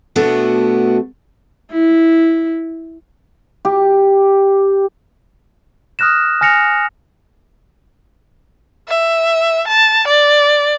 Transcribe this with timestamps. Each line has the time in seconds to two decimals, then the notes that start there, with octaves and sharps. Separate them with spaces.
0.16 B2 A3 B3 D4 E4 F#4
1.72 E4
3.65 G4
5.99 D#6 F6 F#6 A#6 E7
6.41 G#5 F6 A#6 C#7 F7
8.88 E5
9.68 A5
10.08 D5